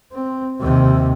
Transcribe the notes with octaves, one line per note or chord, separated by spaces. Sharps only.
C4
D#2 C3